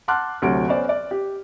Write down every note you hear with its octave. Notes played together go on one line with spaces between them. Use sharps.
F#5 A5 C6 D6 F6 F#6
D2 C3 F#3 D7
B3 C#4 C5 D5
D5
G4